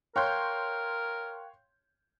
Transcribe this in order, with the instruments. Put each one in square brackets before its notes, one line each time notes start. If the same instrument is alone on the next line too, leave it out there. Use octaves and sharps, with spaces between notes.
[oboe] A#4 [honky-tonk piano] C#5 C6 G6 [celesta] F5 G5 F#6